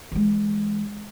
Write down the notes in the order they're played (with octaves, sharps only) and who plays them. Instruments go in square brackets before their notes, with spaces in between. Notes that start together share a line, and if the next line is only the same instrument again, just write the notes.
[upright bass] E3 G#3